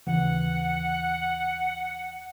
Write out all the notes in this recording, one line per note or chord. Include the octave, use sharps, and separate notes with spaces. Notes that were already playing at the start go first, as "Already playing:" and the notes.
D#2 C#3 E3 F#5